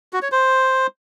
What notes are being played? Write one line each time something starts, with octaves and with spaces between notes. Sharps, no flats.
F#4
C#5
C5